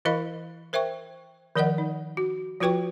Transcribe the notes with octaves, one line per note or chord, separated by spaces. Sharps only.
E3 E4 A#4 D#5 F5 B5
A#4 C5 E5 G5 C#6
D#3 F3 A#4 D5 D#5 F#5
D#4
F#4
F3 F4 F#4 B4 G5 C#6